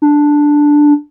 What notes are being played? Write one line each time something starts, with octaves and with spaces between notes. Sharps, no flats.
D4